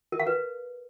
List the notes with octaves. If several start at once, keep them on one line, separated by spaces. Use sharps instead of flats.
A#4
F5
B4